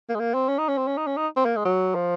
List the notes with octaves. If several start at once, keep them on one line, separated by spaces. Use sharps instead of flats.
A#3
G#3
A#3
C4
C#4
D#4
C#4
C4
C#4
D#4
C#4
D#4
C4
A#3
G#3
F#3
F3